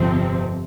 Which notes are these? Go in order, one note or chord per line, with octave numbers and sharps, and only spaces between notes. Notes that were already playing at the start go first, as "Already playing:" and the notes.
Already playing: G1 F2 C3 F3 C4